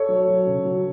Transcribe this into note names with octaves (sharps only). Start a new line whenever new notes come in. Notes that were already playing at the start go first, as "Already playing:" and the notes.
Already playing: A4 C#5
F#3
F#3
C#3
F#3